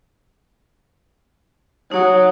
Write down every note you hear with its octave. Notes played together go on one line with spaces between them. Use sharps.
F#3 D#4 C#5 D#6